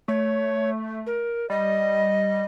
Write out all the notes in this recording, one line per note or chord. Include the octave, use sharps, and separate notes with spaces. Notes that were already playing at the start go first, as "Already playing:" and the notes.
A3 C#5
A#4
G3 D#5